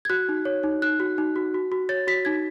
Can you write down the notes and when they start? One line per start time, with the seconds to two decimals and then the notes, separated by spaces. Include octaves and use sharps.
0.05 G#6
0.10 F#4 F#6
0.29 D#4
0.45 C#5
0.63 D#4
0.82 D#4 F#6
1.00 F#4
1.18 D#4
1.36 F#4
1.54 F#4
1.72 F#4
1.89 C#5 A6
2.07 F#4 B6
2.25 D#4 G#6